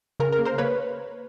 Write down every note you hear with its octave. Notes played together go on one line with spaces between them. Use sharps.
C#3 A#4
A#4
A#3
A#4 C5
A#3 B4 C#5